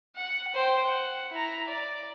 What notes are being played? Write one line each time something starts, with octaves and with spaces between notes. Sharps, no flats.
F#5
C5 G5
F#5
E4 A#5
D5